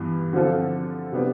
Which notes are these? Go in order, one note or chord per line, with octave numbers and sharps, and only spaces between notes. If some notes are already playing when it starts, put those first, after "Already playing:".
Already playing: G2 E3 B3
D3 F3 C4 F4 A4
C3 G3 B3 D4